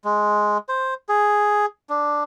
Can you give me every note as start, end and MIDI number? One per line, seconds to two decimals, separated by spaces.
0.04 0.58 56
0.69 0.94 72
1.09 1.66 68
1.89 2.23 62